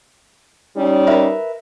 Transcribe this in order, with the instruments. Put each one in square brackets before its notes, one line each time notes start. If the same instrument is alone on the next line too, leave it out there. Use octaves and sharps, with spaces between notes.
[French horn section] G3 C#4 D#4
[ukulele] A#4 B4 E5